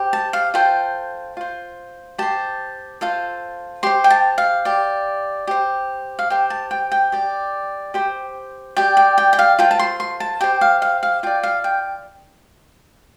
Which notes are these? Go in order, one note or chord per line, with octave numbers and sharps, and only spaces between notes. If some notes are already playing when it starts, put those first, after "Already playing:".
Already playing: G4 C5
A5
F5
F4 A4 C5 G5
F4 C5
G4 C5 A5
F4 A4 C5
G4 C5 C6
G5
A5
F5
G4 D5
G4 C5
F5
G4 C5 G5
A5
G5
G5
G4 D5
G4 C5
G4 D5 G5
G5
G5
G5
F5
F4 A4 C5 G5
A5
C6
C6
A5
G4 C5 G5
F5
F5
F5
F4 D5 G5
F5
G5